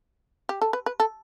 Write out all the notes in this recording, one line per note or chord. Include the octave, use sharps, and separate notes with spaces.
G4
A4
B4
B4
A4